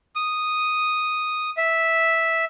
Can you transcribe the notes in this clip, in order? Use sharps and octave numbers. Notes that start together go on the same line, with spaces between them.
D#6
E5